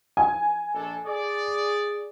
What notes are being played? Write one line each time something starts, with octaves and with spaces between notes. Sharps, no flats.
G#5
A#1 D4 A4
G#4 D5